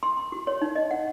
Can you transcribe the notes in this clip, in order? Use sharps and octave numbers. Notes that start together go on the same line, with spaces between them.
C6
C6
F#4
C#5
D#4
D#5
F#5